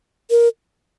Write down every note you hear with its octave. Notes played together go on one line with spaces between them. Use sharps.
A#4